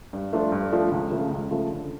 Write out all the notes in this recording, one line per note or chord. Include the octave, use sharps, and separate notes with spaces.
G2
F3 A3 D4 F4
G2
F3 A3 D4 F4
C#2
C#3 F3 A3
C#2
C#3 F3 A3
D3